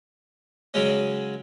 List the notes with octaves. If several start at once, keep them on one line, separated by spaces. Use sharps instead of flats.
C#3 F#3 G#3 C#4